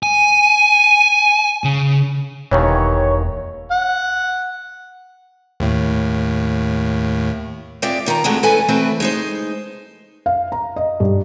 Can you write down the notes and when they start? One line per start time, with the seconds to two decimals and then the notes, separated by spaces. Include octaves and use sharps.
0.03 G#5 D#7
1.64 C#3
2.51 E1 D#2 D#3 E3 C#5
3.71 F#5
5.60 D#2 A2
7.82 G#3 C4 F4 D5 E5
8.06 G2 D#3 F4 A#5
8.24 D2 D3 G#3 A3 C4
8.43 E2 C#4 E4 A4 B4 G#5
8.68 D2 E3 A3 C4 B4
9.00 G#3 D#4 C5
10.26 F5
10.52 A#5
10.76 D#5
11.00 G2